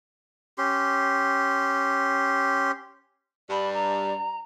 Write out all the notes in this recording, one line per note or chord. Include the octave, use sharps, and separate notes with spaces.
C#4 G4 C6
G2 D5 B5
A#5